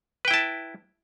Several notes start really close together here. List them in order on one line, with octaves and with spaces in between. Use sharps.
B4 G5 E4 A5